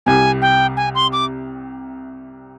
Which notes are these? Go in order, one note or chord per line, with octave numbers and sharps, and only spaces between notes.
C2 C3 G3 G#5
G5
G#5
C6
D6